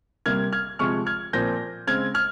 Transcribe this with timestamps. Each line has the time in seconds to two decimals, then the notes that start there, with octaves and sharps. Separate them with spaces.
0.26 C3 G3 A#3 F6 G#6
0.53 F6 G#6
0.79 C3 F3 G#3 C4 C#6 F6
1.06 F6 G#6
1.33 A#2 F3 C4 G6 A#6
1.87 C#3 G#3 C4 F6 G#6
2.14 F6 G#6